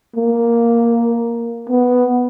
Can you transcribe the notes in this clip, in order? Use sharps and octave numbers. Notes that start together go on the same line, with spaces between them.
A#3
B3